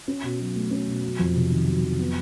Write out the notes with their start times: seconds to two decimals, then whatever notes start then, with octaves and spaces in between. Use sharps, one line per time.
0.08 C#4
0.23 B2
0.40 F#3
0.56 A3
0.71 C#4
0.87 B2
1.03 F#3
1.19 F2
1.36 C3
1.52 D#3
1.68 F#3
1.83 F2
1.99 B3